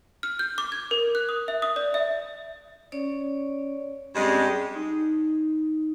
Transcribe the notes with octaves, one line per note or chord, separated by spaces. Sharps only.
F6
G6
D6
G#6
A#4
F#6
D#6
E5
D#6
D5
E5
C#4 C#5 D5
G2 G3 G#3 C4 C#4
D#4